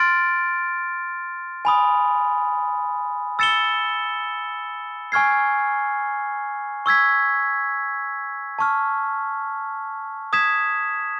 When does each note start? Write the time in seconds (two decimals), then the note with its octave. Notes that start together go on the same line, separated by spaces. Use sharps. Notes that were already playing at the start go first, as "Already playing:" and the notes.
Already playing: C6 F6 A6 D7
1.65 G#5 B5 D#6
3.39 E6 A6 C#7 E7 G7
5.12 G#5 C#6 F6 G#6 C7
6.86 C#6 E6 G#6 B6
8.59 A5 C#6 F6
10.33 D#6 G#6 B6 E7